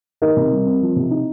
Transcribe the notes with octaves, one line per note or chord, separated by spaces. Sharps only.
D#3 A#4 D#5
C3
G3
C4
F3
C3
D#4